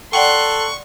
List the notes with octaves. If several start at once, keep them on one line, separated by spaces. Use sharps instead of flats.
A4 D5 F#5 G5 C6 C#6 F#6